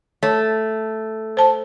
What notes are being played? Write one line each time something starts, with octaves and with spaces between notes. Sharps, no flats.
A3 C#5
C5 A5